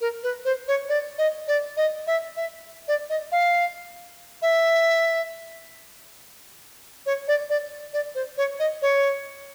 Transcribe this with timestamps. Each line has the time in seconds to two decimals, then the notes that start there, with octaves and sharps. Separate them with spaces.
0.01 A#4
0.23 B4
0.45 C5
0.68 C#5
0.89 D5
1.18 D#5
1.48 D5
1.77 D#5
2.07 E5
2.37 E5
2.88 D5
3.10 D#5
3.32 F5
4.42 E5
7.06 C#5
7.28 D5
7.50 D5
7.93 D5
8.15 C5
8.38 C#5
8.59 D#5
8.82 C#5